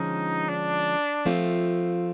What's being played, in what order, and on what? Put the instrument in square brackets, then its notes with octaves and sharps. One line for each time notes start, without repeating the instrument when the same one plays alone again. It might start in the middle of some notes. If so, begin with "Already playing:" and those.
Already playing: [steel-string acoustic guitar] D3 F3 G#3 C#4 [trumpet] D#4
[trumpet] D4
[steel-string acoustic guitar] F3 A3 C4 F4